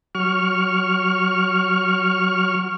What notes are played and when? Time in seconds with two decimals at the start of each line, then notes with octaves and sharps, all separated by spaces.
0.15 F#3 C#6 F6